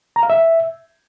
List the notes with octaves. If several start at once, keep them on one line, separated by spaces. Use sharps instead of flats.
A#5
F5
E5